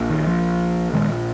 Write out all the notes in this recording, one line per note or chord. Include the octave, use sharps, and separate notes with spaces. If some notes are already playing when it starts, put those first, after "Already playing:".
Already playing: A#1 A#2
D#3
F3
A#1 A#2 D#3 G#3